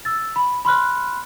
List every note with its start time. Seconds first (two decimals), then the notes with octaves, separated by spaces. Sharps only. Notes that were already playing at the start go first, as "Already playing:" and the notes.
0.05 E6 A6
0.36 B5
0.65 B5 C6 F6 F#6